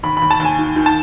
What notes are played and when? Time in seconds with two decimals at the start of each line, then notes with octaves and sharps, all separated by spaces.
0.03 D#2 B5
0.17 D#2 B5
0.31 A5
0.40 D#2 G#5
0.59 D#3
0.76 D#3
0.86 A5